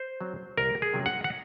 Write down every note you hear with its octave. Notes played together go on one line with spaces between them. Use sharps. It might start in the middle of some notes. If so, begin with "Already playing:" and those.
Already playing: C5
F#3 C4
C2 A#4
G#4
C3 F#3 C#4
F#5
F#5